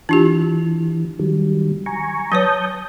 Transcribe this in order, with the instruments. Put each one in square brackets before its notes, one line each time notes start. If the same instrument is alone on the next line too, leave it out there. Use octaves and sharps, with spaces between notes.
[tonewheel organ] E3 [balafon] D4 F4 G4
[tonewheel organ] D#3 F#3 G3
G#5 A#5 C#6
[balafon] F#3 B4 C#5 [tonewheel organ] A5 D#6 G6